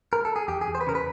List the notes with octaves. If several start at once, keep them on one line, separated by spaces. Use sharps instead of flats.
A#4
A4
G#4
E2 G4
G#4
E2
C5
B4
C#3 A#4
B4